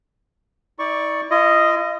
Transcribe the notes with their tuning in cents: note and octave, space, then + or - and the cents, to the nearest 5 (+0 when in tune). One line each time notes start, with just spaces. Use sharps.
E4 -45 D5 +0 C#6 +0
F4 -45 D#5 +0